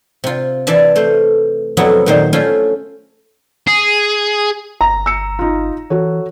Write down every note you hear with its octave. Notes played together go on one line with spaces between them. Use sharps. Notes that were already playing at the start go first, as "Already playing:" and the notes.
C3 F4
E3 D5 E5 A5
A3 C5
F2 C3 F#3 B3 E4
A#2 D#3 C5
A3 C#4 E4 F4 C5
G#4
G1 A#5
E6 C#7
D#4 F4
E3 F#4 A4 C#5